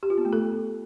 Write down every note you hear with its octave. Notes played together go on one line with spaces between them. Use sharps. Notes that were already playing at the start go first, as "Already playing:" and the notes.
G4
F4
B3
A3
A4